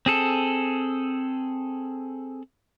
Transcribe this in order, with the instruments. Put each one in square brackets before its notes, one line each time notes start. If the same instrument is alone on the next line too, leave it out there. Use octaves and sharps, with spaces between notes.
[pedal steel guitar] C4 G#4 A4